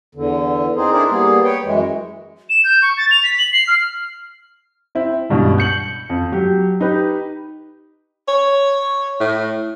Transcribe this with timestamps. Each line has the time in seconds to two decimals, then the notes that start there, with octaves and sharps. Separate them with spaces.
0.15 E2 D3
0.76 C4 D#4 G#4 C5
0.92 D4 E4 G#4 A#4 C5 D5
1.10 G3 A#3 B3 G#4
1.45 B4 C#5 G5
1.64 F#2 E3 G#3
2.50 E7
2.64 G6
2.82 C#6
2.97 A6
3.11 F7
3.24 B6
3.39 F#7
3.52 C7
3.68 F6
4.95 C4 E4
5.29 C#2 G2 B2
5.58 G6 C#7 F#7
6.10 F2
6.32 F#3 G4
6.81 D#4 G4 B4
8.28 C#5
9.20 A2